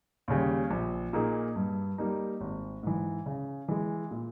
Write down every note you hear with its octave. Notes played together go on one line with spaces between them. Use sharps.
D#2 C#3 G3
A#1
A#2 A#3 D#4 G#4
G2
G3 A#3 D#4
G#1
G#2 E3
C#3
E3 G#3
A#2